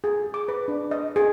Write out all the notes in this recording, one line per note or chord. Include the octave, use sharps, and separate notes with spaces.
G#4
D6
B4
D4
D#5
G#4